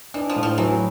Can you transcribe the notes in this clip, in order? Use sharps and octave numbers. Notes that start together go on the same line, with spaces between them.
E3 D4
F3
A2
F3
E3 F#3